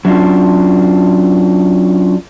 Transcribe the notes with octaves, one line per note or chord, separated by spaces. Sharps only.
F#3 C#4 D4 F4